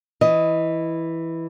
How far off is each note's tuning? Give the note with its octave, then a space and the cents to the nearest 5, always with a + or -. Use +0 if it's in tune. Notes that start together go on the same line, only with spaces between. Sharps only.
E3 +0 D#5 +15